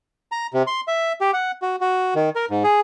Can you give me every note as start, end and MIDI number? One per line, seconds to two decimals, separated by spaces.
0.32 0.47 82
0.54 0.63 48
0.67 0.81 84
0.88 1.13 76
1.21 1.31 67
1.34 1.51 78
1.62 1.76 66
1.81 2.14 66
2.15 2.30 51
2.36 2.45 70
2.50 2.63 44
2.64 2.80 68